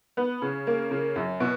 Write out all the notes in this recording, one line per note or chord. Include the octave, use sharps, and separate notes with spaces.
B3
C#3
A#3
C#3
F#2
B2